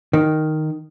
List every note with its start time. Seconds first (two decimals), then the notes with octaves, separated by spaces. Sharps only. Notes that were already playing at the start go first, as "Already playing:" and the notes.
0.13 D#3